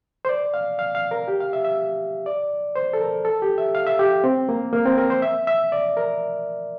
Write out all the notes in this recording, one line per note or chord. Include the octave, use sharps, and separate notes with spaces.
C5
D5
F5
F5
F5
A#4
G4
F5
E5
E5
D5
C5
A4
A#4
A4
G4
E5
F5
E5
G4
C4
A#3
A#3
C4
A#4
C5
E5
E5
D5
A#4